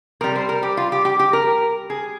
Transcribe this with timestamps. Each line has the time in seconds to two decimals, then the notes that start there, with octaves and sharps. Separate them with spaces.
0.21 C3 G3 A#4
0.36 C5
0.49 A#4
0.63 G4
0.77 F4
0.92 G4
1.05 G4
1.19 G4
1.33 A#4
1.90 G#4